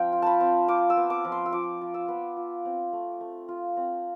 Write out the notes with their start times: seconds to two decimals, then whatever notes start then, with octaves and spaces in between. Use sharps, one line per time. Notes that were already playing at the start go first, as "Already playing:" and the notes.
Already playing: F3 C4 F5 G5
0.12 F4
0.22 A5 B5
0.41 C4
0.68 F4 D6
0.90 E6
0.97 B3
1.10 D6
1.25 F3
1.32 C6
1.46 E6
1.52 F3 D6
1.81 F4
1.94 E6
2.08 B3
2.37 F4
2.65 C4
2.93 A3
3.21 A3
3.49 F4
3.77 C4